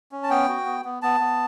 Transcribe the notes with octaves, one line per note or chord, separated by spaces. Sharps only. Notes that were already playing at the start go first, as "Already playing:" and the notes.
C#4
A5
B3 G5
F#4
B3
B3
B3 A5
B3